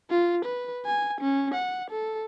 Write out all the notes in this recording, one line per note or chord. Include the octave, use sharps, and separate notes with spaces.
F4
B4
G#5
C#4
F#5
A4